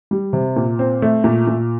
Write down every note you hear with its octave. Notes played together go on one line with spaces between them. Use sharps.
G3
C3
A#2
C4
A3
A#2
A#2